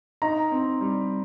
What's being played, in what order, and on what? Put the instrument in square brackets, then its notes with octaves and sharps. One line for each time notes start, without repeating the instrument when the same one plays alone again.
[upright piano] D#4 [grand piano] A#5
[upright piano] C4
G3